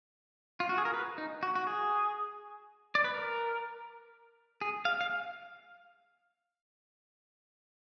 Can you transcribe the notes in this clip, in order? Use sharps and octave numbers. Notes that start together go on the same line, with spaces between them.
F4
F#4
G#4
A#4
B4
D#4
F#4
F#4
G#4
D5
B4
A#4
G#4
F5
F5